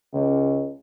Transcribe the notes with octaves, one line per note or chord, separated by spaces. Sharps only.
C#2